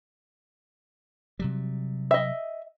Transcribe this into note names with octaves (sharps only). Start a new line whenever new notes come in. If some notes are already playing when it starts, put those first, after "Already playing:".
C3 F#3 G3
D#5 E5